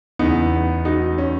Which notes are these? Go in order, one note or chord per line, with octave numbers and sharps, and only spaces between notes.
E2 C#3 E3 B3 D#4
D#4 F#4
C#4